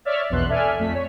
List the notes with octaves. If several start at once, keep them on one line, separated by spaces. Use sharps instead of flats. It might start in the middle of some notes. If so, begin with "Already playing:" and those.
C#5 D5 E5 F6 A6
A#1 E2 B2 C6 F#6
A4 D5 E5 G#5 F6
F2 A3 B6
C#5